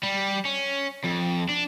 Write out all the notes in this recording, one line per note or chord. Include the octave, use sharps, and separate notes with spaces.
G3
C#4
F2
D4